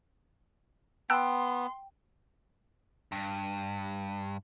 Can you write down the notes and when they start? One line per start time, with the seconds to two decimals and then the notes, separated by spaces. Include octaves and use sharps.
1.10 B3 G5 A5 C6 E6 F#6
3.12 G2